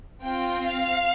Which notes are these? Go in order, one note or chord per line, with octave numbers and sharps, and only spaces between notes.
C4 F4 G5
F5